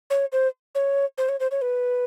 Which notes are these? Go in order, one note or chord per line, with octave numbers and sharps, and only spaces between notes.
C#5
C5
C#5
C5
C#5
C5
C#5
B4